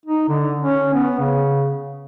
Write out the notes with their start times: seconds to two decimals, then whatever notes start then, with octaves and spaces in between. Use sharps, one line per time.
0.06 D#4
0.29 D3
0.60 C#4
0.94 B3
1.19 C#3